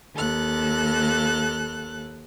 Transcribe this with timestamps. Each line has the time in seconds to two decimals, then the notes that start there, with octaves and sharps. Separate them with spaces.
0.15 D#2 A4 F#6